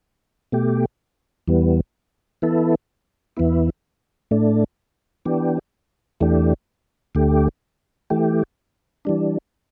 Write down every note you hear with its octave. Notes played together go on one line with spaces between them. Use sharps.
B2 A3 G4
E2 E3 G3 B3
E3 B3 E4 A4
E2 E3 B3 E4
A2 A3 D4
E3 B3 D4 G4
E2 E3 A3 D4 G4
D2 D3 A3 G4
E3 A3 G4
E3 G3 D4